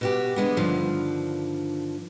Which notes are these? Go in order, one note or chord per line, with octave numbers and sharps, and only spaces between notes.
B2 F#4 G4
D3 G#3 B3
G2 D3 D#3 F3